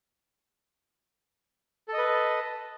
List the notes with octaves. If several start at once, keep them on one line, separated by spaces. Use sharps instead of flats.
A4 B4 D#5